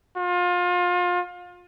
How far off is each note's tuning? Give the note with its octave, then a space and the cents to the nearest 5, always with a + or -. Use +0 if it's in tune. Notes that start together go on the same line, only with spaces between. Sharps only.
F4 +30